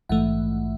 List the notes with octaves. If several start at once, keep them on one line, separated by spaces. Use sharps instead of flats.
A#1 G#2 E3 A3 E5 F#5